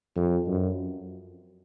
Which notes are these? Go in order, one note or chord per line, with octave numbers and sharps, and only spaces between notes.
F2
F#2